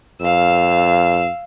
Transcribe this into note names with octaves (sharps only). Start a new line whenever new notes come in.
F2 F5 E6